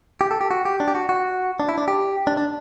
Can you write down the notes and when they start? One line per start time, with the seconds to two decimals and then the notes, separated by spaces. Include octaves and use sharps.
0.21 G4
0.31 A4
0.41 G4
0.51 F#4
0.65 G4
0.80 D4
0.88 G4
0.95 F#4
1.09 F#4
1.60 D4
1.69 E4
1.78 D4
1.88 G4
2.27 D4
2.37 D4